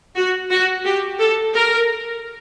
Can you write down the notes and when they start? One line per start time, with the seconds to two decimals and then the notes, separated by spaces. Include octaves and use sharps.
0.16 F#4
0.51 F#4
0.85 G4
1.20 A4
1.55 A#4